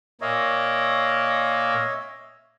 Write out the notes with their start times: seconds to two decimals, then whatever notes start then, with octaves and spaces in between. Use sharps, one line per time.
0.21 A#2 A#3 C#5 D#5 E5